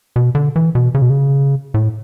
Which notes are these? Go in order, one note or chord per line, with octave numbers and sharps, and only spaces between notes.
B2
D3
E3
B2
C#3
B2
C#3
A2